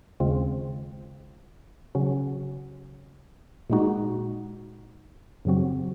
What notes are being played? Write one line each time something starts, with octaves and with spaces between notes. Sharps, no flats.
D#2 C#3 G#3 C4 F4
C#3 F#3 C#4 F#4
A#2 G#3 D#4 F#4
F#2 C#3 F#3 C4 F#4